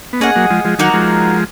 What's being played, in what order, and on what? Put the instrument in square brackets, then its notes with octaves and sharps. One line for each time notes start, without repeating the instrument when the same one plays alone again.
[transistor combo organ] B3
[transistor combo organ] A#3 C#4 [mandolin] G#4 D#5 F#5
[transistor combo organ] F#3 A#3
F3 G#3
F3 G#3
[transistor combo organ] D#3 F#3 [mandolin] A#3 D#4 F#4
[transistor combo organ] F3 G#3